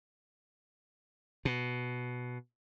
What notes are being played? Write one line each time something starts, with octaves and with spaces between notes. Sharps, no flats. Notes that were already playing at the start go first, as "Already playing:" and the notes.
B2